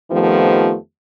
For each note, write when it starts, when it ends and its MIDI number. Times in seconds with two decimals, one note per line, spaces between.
0.11 0.75 41
0.11 0.75 51
0.11 0.75 53
0.11 0.75 57
0.11 0.75 59
0.11 0.75 67